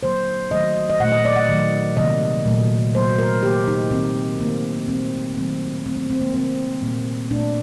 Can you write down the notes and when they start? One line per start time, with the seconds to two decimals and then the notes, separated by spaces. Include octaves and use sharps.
0.03 D3 F#3 A#3 C5
0.51 D#3 F#3 A3 D#5
0.90 D#5
1.00 A#2 F#5
1.04 A3
1.12 D#5
1.25 D5
1.36 F#5
1.49 D#3 F#3 A3
1.97 C3 D#3 G3 A#3 D#5
2.46 A#2 F#3 A3
2.95 C3 F#3 A#3 C5
3.19 A#4
3.43 D#3 G3 A#3 G4
3.68 D#4
3.91 D#3 G3 A#3 C4
4.40 C3 D#3 A3 A#3
4.88 A#2 G3 A#3 C4
5.37 D#3 F#3 A3 C4
5.85 D3 A3 C4
5.97 C4
6.10 C4
6.22 A#3
6.33 C3 D#3 G3 C4
6.82 A#2 G3 A#3
7.31 A#2 D4
7.35 A3